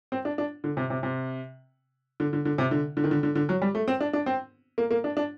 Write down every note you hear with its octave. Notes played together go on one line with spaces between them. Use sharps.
C4
D4
D4
D3
C3
C3
C3
D3
D3
D3
C3
D3
D3
D#3
D3
D3
D3
F#3
G3
A3
C4
D4
D4
C4
A#3
A#3
D4
D4